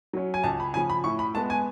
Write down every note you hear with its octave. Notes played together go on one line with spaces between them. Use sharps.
F#3 C#4
G#5
C#2 A5
B5
C#3 F3 G#5
B5
A2 C#6
B5
G#3 B3 A5
G#5